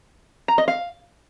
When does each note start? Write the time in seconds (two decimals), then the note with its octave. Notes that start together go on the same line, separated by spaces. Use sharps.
0.48 A#5
0.58 D#5
0.68 F5